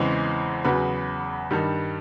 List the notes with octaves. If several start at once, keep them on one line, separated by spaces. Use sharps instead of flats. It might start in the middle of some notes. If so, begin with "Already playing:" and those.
Already playing: E2 C#3 E3 G#3 C4
E2 C#3 F#3 B4
G2 D#3 G3